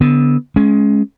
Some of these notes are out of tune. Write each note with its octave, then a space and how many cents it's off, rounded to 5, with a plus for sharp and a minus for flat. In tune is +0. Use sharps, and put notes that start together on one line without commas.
D3 -20 B3 +0
G#3 +20 C#4 +0